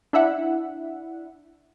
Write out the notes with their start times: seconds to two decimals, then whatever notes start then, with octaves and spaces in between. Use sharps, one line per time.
0.13 D4 E4 E5 F#5